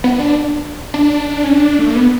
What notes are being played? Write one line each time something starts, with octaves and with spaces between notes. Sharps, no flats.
B3
D4
D4
C#4
D4
A3
A#3
B3